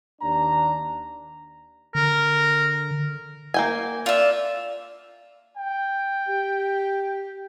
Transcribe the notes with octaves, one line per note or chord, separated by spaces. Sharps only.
D#2 D4 A#5
D3 A#4
A#3 G5 G#5
F4 D5 E5
G5
G4